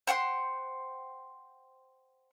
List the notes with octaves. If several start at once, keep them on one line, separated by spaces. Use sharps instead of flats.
C5 F#5 G5 C6